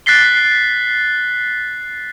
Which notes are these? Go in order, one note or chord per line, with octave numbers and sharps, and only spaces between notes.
F#6 A6 B6 C7 G7